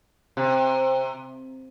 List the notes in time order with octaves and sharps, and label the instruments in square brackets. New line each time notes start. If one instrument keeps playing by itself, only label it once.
[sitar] C3